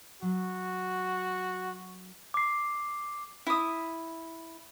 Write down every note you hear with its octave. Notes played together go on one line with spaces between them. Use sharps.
F#3 F#4
D6 C7
E4 D#6